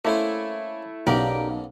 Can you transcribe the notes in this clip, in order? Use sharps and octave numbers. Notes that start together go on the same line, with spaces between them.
A3 A#3 C#4 E4 C5
B1 C#3 A#3 B3 G4 A#4 D5